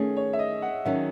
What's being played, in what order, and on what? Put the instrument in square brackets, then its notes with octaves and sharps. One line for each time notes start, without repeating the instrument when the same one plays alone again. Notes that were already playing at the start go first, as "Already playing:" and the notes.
Already playing: [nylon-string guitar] D#3 A3 C#4 [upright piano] G#4
[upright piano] C#5
E5
D#5
F#5
[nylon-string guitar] D#3 F#3 C#4 F#4 [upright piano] E5